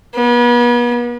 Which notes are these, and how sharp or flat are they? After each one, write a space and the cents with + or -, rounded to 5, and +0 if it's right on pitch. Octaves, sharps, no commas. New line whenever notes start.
B3 -40